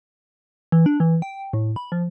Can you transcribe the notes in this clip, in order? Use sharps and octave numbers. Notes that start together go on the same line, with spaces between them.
E3
D4
E3
G5
A2
B5
F3